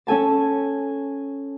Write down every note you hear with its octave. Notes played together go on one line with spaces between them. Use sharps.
C#4 A4 G#5 A5